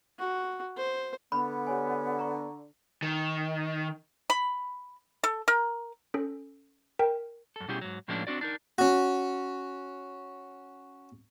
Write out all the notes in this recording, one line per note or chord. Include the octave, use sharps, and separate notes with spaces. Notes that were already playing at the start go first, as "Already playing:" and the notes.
F#4
C5
D3 B3 B5
G4 C#5 G#5
A#5 C#6
D#3
B5
A4
A#4
C#4 A4
A#4 G5
F#2 A4
B2 G3 C#4 E4 G4 G#4
G#2 F#3
A2 F3 G#3 A#3 C#4 D4
C4 D4 F#4 D5
D4 D#4 A#4
C#4 F#4